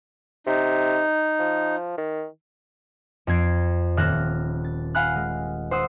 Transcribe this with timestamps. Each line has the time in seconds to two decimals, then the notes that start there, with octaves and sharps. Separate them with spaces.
0.47 C3 D#4
1.39 F3
1.98 D#3
3.27 F2 C4 G#6 C7 D7
3.97 D#1 F6 F#6 A#6 E7
4.64 A6
4.95 F5 F#5 G#5 B5 F6 F#6
5.15 G#3
5.71 C5 F#5 D#6 E6